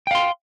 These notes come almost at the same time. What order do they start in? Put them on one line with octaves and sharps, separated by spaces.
G5 F5 C6